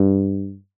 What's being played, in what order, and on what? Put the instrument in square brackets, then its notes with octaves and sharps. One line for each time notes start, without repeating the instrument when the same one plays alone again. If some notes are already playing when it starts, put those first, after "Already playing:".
Already playing: [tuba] G2